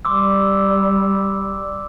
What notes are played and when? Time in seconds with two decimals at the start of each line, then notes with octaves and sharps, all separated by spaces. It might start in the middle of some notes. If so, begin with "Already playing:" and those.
0.05 G3 C6 D6 E6